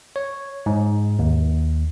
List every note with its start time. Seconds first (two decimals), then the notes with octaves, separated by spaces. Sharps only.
0.16 C#5
0.66 G#2
1.19 D#2